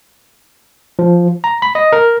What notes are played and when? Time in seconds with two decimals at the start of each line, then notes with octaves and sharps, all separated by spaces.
0.99 F3
1.44 A#5
1.62 B5
1.75 D#5
1.92 A#4